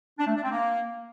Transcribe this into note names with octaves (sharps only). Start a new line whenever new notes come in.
D4
A3
D4
C4
A#3